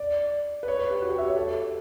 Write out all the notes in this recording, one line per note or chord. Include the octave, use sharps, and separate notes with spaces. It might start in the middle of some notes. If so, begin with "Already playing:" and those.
Already playing: D5
B4
C#5
B4
G4
F#4
G4
E5
C#5
A4